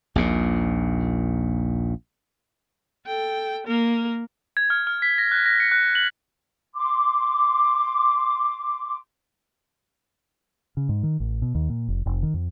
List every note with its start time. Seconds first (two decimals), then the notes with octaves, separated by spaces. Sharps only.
0.15 A#1 D#2 A#2
3.06 A4 G5
3.67 A#3 A#4
4.57 G#6
4.70 F6
4.87 F6
5.02 B6
5.18 A#6
5.32 F#6
5.46 A#6
5.60 C#7
5.72 F#6
5.95 F#7
6.75 C6 D6
10.77 C#3
10.89 G#2
11.03 D#3
11.20 A1
11.42 B2
11.55 D#2
11.70 A#2
11.88 F1
12.06 F1
12.23 D#3
12.34 F2